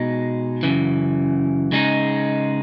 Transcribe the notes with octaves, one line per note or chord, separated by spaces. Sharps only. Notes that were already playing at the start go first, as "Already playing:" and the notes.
Already playing: B2 G#3 D#4
F#2 C#3 E3
C#3 G#3 D#4